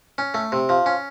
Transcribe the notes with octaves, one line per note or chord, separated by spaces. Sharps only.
C#4
A3
C3
F3
C#4